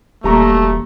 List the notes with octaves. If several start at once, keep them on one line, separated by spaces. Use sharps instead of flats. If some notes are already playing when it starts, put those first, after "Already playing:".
E1 G3 A3 A#3 A#5 C#6